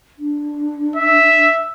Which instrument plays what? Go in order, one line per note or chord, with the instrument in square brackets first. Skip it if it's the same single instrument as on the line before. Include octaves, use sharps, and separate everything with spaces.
[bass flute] D4
[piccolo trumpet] E5